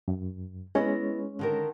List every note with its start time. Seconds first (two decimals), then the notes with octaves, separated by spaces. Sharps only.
0.08 F#2
0.75 G#3 B3 C#4 E4 C#5 D#5
1.39 D3 D#3 A#4